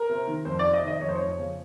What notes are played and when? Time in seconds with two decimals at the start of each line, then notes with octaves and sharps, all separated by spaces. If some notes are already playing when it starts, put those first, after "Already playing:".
Already playing: A#4
0.09 C3
0.27 D#3
0.45 F2 C5
0.59 D5
0.64 C3
0.73 D#5
0.82 D#3
0.87 D#5
1.01 F2 C#5
1.09 C5
1.15 F2 C#5
1.38 C#3